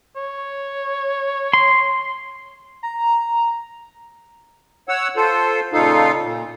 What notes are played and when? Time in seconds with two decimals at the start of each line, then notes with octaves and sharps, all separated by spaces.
0.16 C#5
1.53 C6
2.83 A#5
4.89 C#5 F#5 E6
5.16 F4 A4 C5
5.73 A#2 C#3 D#4 F4 A4 F5
6.23 A#2